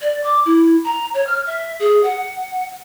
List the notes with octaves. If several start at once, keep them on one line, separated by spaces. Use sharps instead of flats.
D5
D6
E4
A#5
C#5
F6
E5
G#4
F#5